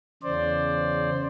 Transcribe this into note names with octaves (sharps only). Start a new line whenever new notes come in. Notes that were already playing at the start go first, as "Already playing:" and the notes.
E2 C#3 C5 D5